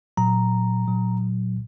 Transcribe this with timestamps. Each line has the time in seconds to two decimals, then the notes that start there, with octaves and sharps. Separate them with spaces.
0.17 A#2 F#3 A#5
0.88 A#2 F#3